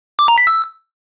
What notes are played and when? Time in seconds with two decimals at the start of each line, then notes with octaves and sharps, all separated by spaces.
0.19 D6
0.28 A#5
0.38 B6
0.47 E6